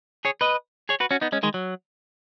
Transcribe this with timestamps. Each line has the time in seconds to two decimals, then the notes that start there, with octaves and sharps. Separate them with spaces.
0.25 G#4 C#5
0.41 B4 D#5
0.89 G#4 C#5
1.00 F#4 B4
1.11 C#4 F#4
1.21 B3 D#4
1.32 G#3 C#4
1.43 D#3 G#3
1.54 F#3